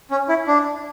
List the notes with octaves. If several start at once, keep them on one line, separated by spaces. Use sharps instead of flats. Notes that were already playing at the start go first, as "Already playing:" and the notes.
C#4
E4
D4